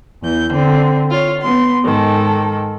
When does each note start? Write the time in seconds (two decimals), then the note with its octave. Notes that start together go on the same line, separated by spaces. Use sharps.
0.20 E2 G6
0.51 D3 C4
1.11 F4 C#5
1.40 B3 C6
1.83 G#2 D#3 A4